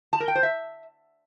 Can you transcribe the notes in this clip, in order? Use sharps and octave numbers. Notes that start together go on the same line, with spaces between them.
A5
A#4
G5
C5
E5